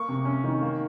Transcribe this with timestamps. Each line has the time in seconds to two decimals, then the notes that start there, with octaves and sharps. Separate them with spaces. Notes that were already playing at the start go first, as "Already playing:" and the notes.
Already playing: A#3 C#6
0.09 C3
0.25 C#4
0.44 D#3
0.61 A#3